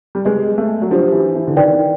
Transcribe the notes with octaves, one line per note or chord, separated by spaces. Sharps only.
G3
G#3 G#4 B4 D#5
A3
F#3
F3 D4 G4 C5
E3
E3
D3
D#3 B4 D5 G5
D#3